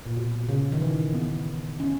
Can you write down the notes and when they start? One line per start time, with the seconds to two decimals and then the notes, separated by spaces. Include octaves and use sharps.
0.06 A#2
0.17 B2
0.49 C#3
0.72 D#3
0.82 E3
1.14 B3
1.80 C#4